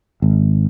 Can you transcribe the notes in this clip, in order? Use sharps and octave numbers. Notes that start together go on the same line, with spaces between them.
G#1